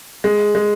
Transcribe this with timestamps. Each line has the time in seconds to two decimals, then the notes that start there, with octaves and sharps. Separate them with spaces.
0.24 G#3
0.55 G#3